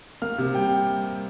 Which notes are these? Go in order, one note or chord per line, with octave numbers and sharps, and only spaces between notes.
A#3 F6
C3
G3 G5